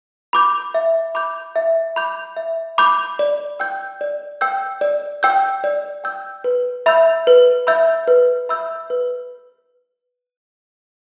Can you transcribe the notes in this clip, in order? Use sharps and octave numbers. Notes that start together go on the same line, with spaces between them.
B5 D6 G6
E5
B5 D6 G6
E5
B5 D6 G6
E5
B5 D6 G6
D5
G5 E6 G6
D5
G5 E6 G6
D5
G5 E6 G6
D5
G5 E6 G6
B4
E5 B5 E6 G6
B4
E5 B5 E6 G6
B4
E5 B5 E6 G6
B4